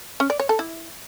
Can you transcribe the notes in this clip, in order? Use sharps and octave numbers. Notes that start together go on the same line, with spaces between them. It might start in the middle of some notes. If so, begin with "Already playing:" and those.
C#4
D5
C#5
A4
E4